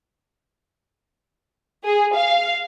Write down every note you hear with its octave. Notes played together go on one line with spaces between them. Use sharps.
G#4
F5